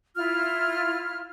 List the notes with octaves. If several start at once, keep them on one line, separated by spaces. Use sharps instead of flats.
E4 F4 F6